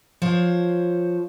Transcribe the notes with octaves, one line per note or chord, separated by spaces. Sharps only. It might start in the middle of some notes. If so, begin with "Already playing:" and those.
F3 C5 C#5